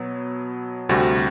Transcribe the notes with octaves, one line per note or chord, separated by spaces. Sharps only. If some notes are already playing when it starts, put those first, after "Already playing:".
Already playing: B2 F#3 B3
D2 C3 G3 C4 F#4